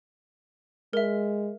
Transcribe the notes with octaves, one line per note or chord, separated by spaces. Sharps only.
G#3 A#4 E5